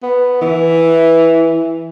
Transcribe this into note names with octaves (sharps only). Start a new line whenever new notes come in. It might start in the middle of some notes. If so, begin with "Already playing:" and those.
B3
E3